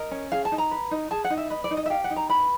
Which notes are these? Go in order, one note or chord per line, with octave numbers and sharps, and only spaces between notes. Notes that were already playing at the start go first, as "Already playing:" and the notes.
Already playing: A#4 D#5
C#4
G#4 F5
A5
D#4
A#5
B4
D#4
G#4 A5
F#5
D#4
E5
B4 D#5
D5
D#4
D#5
E5
G4 F5
F#5
D#4
A#5
B4 B5